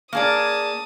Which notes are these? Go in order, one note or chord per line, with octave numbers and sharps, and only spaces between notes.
A#3 G#4 D5 A5 D#6